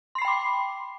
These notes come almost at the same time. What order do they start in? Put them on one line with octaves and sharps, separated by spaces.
C6 C7 B5 G5 D6